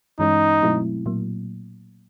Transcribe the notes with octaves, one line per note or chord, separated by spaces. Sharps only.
G2 E3 G#3 C#4 D#4
B2 F#3 A3 C4 E4
A#2 F#3 A#3